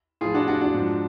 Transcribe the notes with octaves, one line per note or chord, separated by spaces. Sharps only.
A2 F3 F4 G#4
D4 F#4
D4 F#4
D4 F#4
G#2 F3